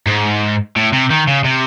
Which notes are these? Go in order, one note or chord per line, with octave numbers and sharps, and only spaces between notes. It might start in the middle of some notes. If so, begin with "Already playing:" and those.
G#2
A2
C3
D#3
C#3
C3